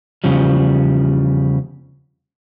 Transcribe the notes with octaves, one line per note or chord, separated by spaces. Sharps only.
E2 C#3 F3 G3